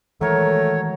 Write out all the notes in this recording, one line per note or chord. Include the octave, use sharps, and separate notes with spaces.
D#3 E3 F#3 G#3 A3 A#4 C#5